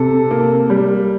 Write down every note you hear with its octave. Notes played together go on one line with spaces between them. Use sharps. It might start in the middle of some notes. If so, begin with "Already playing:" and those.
Already playing: C3 A4
A#3
G3